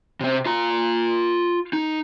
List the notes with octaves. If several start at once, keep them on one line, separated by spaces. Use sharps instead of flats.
C3 C4
F4 A#5
D#4